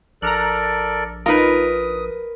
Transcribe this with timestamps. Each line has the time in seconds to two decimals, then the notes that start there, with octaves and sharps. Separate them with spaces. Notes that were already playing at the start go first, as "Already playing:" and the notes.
0.22 A#1 A4 A#4 D5 A#5 F6 F#6
1.26 D#4 F4 A#4 B4 D#6